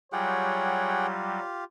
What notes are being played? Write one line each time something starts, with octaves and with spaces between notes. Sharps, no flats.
F#3 G3 F4 G4 G#4 C#5 F#5 G5